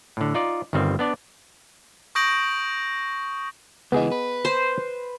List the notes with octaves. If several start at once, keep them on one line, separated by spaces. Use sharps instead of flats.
A2 D3
D#4 F4 D5
G1 D#3 G3 C4
B3 D4 D5
C#6 D#6 G6 A#6 D7 F#7
C#2 E3 B3 G#4 D#5
B4
C5